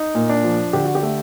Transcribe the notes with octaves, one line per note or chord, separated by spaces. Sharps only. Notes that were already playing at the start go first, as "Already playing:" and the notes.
Already playing: D#4
A#2
D4
F3
D3 G4
F#4
G4
A3